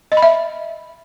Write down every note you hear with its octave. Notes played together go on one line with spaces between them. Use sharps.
D#5
B5
E5